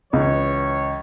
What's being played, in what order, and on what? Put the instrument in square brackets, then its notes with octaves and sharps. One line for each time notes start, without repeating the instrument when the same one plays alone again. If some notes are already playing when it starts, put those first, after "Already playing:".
[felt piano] C#2 [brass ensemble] E3 C#5